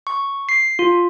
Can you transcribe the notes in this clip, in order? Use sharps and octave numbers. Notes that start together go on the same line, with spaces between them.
C#6
C7
F4